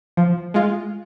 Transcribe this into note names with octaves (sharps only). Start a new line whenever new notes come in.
F3
G#3 F4